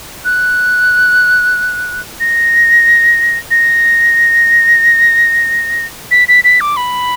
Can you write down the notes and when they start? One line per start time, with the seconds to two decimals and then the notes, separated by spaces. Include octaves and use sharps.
0.25 F#6
2.20 A#6
3.51 A#6
6.11 B6
6.28 B6
6.44 B6
6.61 D6
6.77 B5